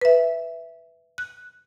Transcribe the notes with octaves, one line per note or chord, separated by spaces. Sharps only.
B4 E5
F#6